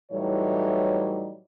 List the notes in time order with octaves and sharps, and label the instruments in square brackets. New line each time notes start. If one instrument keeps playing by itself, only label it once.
[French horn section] A2 E3 F#3 G3 D#4 C#5